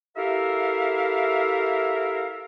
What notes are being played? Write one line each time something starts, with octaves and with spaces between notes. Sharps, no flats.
E4 G4 A4 A#4 E5 F5